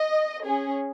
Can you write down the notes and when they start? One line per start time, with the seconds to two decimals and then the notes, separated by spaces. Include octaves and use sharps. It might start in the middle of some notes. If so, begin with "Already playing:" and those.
Already playing: D#5
0.44 C#4 G#4